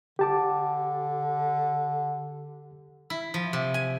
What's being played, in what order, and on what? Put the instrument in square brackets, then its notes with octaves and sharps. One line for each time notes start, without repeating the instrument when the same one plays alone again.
[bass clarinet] D3 [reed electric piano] G4 A5 D6
[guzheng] E4
F3
C3
G#5